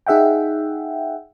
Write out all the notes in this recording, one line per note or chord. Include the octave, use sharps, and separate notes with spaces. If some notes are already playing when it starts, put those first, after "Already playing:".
D#4 G#4 E5 F#5 G5